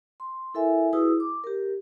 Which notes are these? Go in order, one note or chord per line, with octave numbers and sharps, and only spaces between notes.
C6
E4 A4 A#4 E5 G#5
E4 F#4 G#4 B4 D#6 E6
D6
G4 A#4